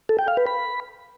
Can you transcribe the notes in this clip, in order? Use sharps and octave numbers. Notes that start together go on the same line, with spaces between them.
A4
G5
F5
B4
B5